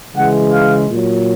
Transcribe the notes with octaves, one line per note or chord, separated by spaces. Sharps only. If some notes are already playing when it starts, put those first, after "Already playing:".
C#3 E3 G#3 F#5
F5
A#2 F#3